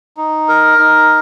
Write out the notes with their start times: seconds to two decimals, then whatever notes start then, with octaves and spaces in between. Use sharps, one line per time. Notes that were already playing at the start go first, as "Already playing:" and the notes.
0.17 D#4
0.48 A#4
0.78 D#4